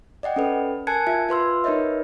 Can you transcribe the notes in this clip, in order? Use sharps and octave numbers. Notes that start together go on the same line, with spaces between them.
D5 D#5 F#5 G5
C#4 A4 B4
A#4 G#5 A5 F#6 G#6 C#7
F4 E5 G#6
F4 B4 C6 E6
D#4 A#4 B4 C#5 D#5 E5